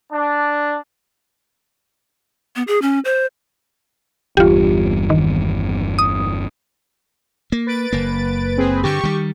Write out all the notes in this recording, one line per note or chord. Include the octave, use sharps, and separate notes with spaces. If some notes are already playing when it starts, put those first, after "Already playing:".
D4
B3
G#4
C#4
C5
G1 E2 G2 F4 G4
D#3
D#6
A#3
B4 A6 D7
F#1 A#3
C4 G#4 B4
G2 D3 G4 C#6
D#3 G3